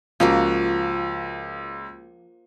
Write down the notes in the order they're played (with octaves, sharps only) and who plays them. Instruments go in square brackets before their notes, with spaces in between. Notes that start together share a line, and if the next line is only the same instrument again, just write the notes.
[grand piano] C#2 [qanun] F3 A#3 F#4